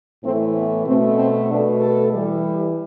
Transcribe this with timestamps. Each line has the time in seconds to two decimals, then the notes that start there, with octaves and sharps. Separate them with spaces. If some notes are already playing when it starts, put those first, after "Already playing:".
0.24 A2 E3 A3 C4
0.56 B3
0.86 B2 A3 C4
1.18 C4
1.49 B2 A3 D4
1.81 A4
2.13 E3 G3